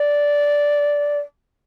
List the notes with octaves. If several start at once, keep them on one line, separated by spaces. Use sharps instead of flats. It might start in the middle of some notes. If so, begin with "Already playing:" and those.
Already playing: D5